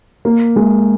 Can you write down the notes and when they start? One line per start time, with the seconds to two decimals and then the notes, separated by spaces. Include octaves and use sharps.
0.25 A#3
0.56 G#3